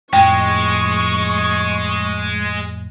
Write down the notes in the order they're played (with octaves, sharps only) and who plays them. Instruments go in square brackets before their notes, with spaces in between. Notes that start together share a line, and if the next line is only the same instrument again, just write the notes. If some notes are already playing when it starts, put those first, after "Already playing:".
[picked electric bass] F2 A2 F3 [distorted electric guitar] G#3 [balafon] G5 [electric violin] C#6